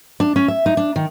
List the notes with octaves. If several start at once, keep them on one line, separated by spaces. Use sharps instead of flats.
D4
C#4
E5
D#4
D4
D#3